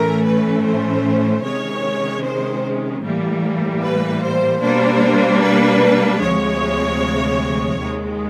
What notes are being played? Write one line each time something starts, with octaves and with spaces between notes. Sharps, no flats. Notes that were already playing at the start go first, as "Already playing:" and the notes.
Already playing: A2 E3 A3 C#4 A#4
B4
C5
C3 D#3 G#3 C#4 C#5
C5
A2 E3 G3 A#3
B4
C5
B2 G3 A#3 D4 C5
B4
D2 C3 F3 G#3 C#5
D#2 D#3 G#3